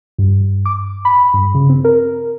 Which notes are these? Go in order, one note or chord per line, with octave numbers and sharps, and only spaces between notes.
G2
D6
B5
G2
C#3
C4
A#4